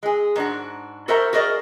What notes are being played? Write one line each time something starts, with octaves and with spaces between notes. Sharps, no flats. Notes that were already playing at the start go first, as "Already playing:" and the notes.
G#3 G#4
G#2 D4 F#4
F#4 A4 A#4 C5 E5 A#5
F#4 G#4 A#4 D5 D#5